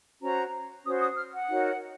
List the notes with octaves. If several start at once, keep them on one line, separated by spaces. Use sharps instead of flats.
C#4 F#4 C5 A#5
C#4 F#4 C5 D#6
D#6
F6
F#5
D#4 F#4 A#4 C#5